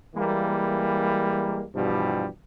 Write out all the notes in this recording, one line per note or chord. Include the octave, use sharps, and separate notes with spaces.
E3 G3 G#3 A#3
G2 B2 E3 F3 G3